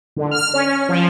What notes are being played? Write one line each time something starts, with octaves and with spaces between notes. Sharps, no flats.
D3
F6
C#4
F3